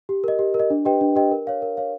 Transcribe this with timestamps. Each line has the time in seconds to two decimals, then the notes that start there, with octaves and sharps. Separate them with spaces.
0.09 G4
0.24 A#4 D#5
0.39 G4
0.54 A#4
0.60 D#5
0.70 D4
0.85 G4 B4 D#5 G5
1.01 D4
1.16 G4 B4 D#5 G5
1.32 A#4
1.47 C#5 F5
1.62 A#4
1.77 C#5 F5